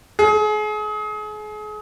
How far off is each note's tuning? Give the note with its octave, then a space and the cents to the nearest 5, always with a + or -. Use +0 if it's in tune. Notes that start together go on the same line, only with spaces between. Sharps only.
G#4 +35